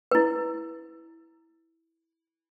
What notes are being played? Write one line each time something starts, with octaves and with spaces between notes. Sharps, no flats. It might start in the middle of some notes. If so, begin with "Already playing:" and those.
E4 B4